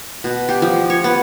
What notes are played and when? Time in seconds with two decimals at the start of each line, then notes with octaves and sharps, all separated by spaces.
0.24 B2
0.49 G4
0.62 F3
0.90 C#5
1.04 B3